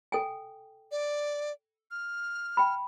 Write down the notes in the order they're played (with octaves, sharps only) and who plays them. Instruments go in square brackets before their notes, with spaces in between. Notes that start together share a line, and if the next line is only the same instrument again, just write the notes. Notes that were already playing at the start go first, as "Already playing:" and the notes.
[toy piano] A4 G5 G#5
[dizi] D5
F6
[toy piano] G5 B5